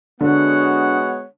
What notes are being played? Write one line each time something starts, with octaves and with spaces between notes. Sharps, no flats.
D3 G#3 B3 F#4 C#5 F#5